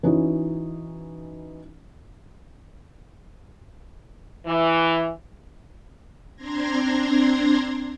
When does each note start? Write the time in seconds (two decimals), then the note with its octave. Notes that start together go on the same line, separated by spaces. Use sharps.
0.03 E3 C#4 D#4 E4 F#4
4.46 E3
6.36 C4 D4 A#5 C6 G#6 A#6